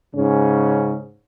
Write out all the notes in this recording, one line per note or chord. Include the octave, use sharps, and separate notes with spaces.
G#2 C#3 C#4